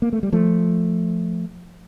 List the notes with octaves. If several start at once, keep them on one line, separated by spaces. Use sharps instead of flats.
A#3
A3
G3
F3 A3